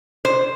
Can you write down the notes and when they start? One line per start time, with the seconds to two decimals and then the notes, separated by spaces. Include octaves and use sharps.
0.25 C5